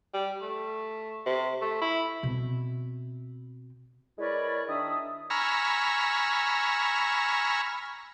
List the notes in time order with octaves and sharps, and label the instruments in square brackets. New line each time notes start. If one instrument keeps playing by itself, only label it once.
[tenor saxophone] G3
A3
C3
A3
E4
[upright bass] B2 C4
[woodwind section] G#3 E4 A#4 B4 C#5 D5
D#3 D4 E5 D#6
[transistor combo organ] G#5 A#5 B5 C#6 E6 F6